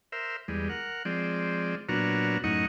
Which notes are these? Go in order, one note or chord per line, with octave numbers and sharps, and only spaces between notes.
A#4 C5 E5
E2 G3 G#3
A#4 F#5
F3 G#3 C4 D5
A#2 F#3 B3 D4 F#4 A#5
F#2 A2 D#4 D#5 F#5 C#6